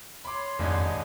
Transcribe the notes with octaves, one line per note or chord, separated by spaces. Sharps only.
C#5 B5 C6 D6
D#1 F2 G#2 D4 D#4 G#5